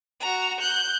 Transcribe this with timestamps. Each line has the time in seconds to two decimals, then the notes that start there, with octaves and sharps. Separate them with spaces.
0.21 F#4 A#5
0.60 F#6 G6